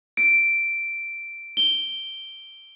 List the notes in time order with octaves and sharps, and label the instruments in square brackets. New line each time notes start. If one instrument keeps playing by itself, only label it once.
[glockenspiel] D7
G7